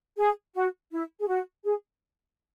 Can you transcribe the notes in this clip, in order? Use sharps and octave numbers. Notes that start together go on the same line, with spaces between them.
G#4
F#4
E4
G#4
F#4
G#4